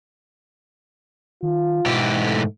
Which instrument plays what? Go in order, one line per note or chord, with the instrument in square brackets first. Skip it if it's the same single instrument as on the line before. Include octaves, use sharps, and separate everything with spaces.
[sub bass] D#3 [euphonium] F4
[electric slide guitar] G#2 E3 G4 [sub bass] B2
[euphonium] A3